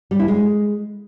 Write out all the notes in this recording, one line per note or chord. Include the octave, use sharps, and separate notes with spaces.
G3
E4
G#3